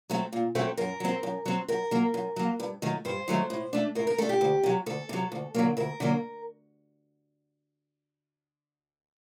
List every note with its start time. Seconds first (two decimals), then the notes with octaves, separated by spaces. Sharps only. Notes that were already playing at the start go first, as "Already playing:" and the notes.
0.10 F#3 A3 C4
0.33 A#2
0.55 F#3 A3 C4
0.77 F#2 A#4
1.00 F#3 C4
1.23 F#2
1.46 F#3 C4
1.68 F#2 A#4
1.91 F#3 A#3
2.14 F#2
2.36 F#3 A#3
2.60 G2
2.82 D#3 F#3 A3
3.05 G2 C5
3.28 D#3 F#3 A3
3.50 A2
3.73 A3 D4
3.95 A2 A#4
4.07 A#4
4.18 A3 D4 A4
4.29 G4
4.41 D2
4.63 C3 F#3
4.86 D2 A4
5.09 C3 F#3
5.32 D2
5.55 D3 F#3 A#3
5.77 D2 A#4
6.00 D3 F#3 A#3